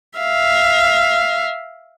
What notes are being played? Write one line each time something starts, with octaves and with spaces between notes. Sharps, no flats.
E5 F5